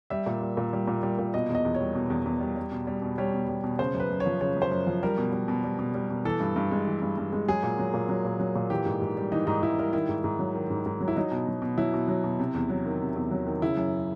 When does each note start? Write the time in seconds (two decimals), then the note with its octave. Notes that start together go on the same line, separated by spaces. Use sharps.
0.10 G3 E5
0.26 A#2
0.41 G3
0.57 A#2
0.73 G3
0.88 A#2
1.03 G3
1.19 A#2
1.34 B2 D#5
1.49 E2
1.55 D#5
1.65 E2
1.75 C#5
1.80 G3
1.95 B2
2.10 E2
2.26 E2
2.41 G3
2.57 G3
2.72 B2
2.87 G3
3.02 B2
3.18 G3 C#5
3.34 B2
3.49 G3
3.64 B2
3.79 C#3 C5
3.94 F#2
4.00 B4
4.10 F#2
4.20 C#5
4.26 F3
4.41 C#3 C#5
4.56 F#2
4.62 C5
4.71 F#2
4.87 F3
5.03 G3 A#4
5.18 B2
5.32 G3
5.48 B2
5.64 G3
5.79 B2
5.94 G3
6.10 B2
6.25 E3 A4
6.40 G2
6.56 G2
6.71 G#3
6.87 E3
7.02 G2
7.18 G2
7.33 G#3
7.48 F#3 G#4
7.63 A#2
7.78 F#3
7.94 A#2
8.09 F#3
8.25 A#2
8.40 F#3
8.56 A#2
8.70 E3 G4
8.86 G#2
9.02 G#2
9.17 G3
9.32 E3 D#4
9.47 G#2 D#4
9.63 G#2 E4
9.78 G3 A#4
9.93 D#3 E4
10.09 G#2
10.24 G#2
10.39 F#3
10.55 D#3
10.70 G#2
10.86 G#2
11.00 F#3
11.08 E4
11.16 F#3 D#4
11.31 B2
11.47 F#3
11.62 B2
11.78 F#3 E4
11.94 B2
12.08 F#3
12.24 B2
12.39 C3
12.55 E2
12.69 F#3
12.86 D#3
13.01 C3
13.16 E2
13.31 F#3
13.47 D#3
13.62 C#3 E4
13.77 F#2